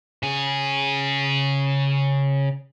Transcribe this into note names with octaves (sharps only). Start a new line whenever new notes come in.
C#3 G#4